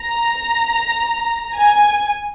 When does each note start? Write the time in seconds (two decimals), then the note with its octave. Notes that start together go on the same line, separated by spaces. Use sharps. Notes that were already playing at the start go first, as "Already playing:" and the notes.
Already playing: A#5
1.54 G#5